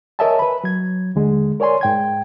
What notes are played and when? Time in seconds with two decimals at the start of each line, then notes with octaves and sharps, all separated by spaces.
0.19 A#4 C#5 D#5 E5 G#5 A5
0.39 B4 B5
0.64 F#3 G#6
1.15 D#2 D3 G#3
1.60 A#4 C#5 D5 G#5 C6
1.81 G#2 G5 G#6